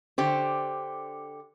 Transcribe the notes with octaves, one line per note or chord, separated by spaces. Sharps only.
D3 G4 C5